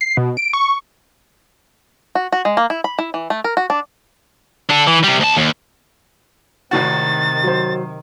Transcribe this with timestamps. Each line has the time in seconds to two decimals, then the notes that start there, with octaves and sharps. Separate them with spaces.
0.01 C7
0.17 B2
0.37 D7
0.53 C#6
2.15 F#4
2.32 F#4
2.45 G#3
2.57 A#3
2.70 E4
2.84 B5
2.99 E4
3.14 E3
3.30 A3
3.44 A#4
3.57 F#4
3.70 D4
4.69 D4 A4
4.87 E3
5.03 C3 G3
5.20 D2 A5
5.37 D#2
6.71 G#1 A2 C3 D#3 F#4 A6
7.43 F#3 C5